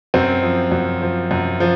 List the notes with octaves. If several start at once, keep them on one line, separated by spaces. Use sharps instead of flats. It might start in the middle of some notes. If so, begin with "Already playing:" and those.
F#2 C4
F3
F#2
F3
F#2
F3